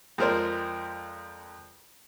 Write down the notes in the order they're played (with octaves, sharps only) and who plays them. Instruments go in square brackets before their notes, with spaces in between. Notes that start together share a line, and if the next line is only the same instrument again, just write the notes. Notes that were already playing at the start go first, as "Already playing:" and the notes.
[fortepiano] F2 G#3 A#4 C5 D5